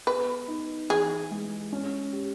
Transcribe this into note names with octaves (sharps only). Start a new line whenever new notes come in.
B3 B4
D#4
E3 G#4
G#3
C#4
G4